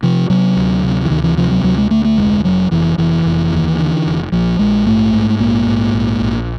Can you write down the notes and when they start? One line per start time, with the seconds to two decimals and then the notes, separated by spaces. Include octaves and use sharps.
0.03 C3 F3
0.30 C3 F#3
0.56 D2
0.83 C3
1.06 E3
1.10 D2 D#3
1.23 E3
1.37 C3 F3
1.51 F#3
1.64 D2 F#3
1.78 G#3
1.91 D2 A3
2.05 A3
2.18 F1 G#3
2.44 F1 F#3
2.71 F1 E3
2.98 F1 E3
3.26 F1
3.53 D#2
3.79 D3
4.06 F1
4.32 A#1 F3
4.59 A#1 G#3
4.86 G#2 A3
5.13 G#2
5.40 A#1 A#3
5.66 G#2
5.94 A#1
6.20 A#1